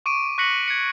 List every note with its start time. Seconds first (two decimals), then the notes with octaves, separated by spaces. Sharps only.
0.06 C#6 D6 D7 D#7
0.38 C#6 F#6 A#6 B6 C#7 F#7
0.68 G#6 C#7